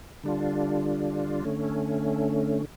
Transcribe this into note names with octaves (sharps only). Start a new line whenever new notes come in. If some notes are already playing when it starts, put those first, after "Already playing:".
D3 G3 D4 F4
D3 A3 C#4